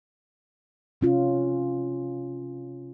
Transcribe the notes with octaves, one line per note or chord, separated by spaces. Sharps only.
C3 C#4 F4